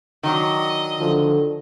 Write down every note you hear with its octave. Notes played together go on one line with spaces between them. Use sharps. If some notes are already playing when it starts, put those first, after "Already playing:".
D#3 F#3 D4 D#5
D3 F3